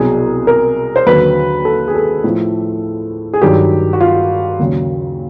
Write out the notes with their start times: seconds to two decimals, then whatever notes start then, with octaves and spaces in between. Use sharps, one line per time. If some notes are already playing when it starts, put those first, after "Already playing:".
Already playing: C2 B2 F#3 G#4
0.47 A#4
0.96 C5
1.06 D#2 D3 F#3 B4
1.65 A4
1.88 G#4
1.95 A4
2.24 A2 F3
3.33 G#4
3.42 G2 D#3 F#3 G4
3.93 F#4
4.01 F4
4.59 D#2 C#3 F#3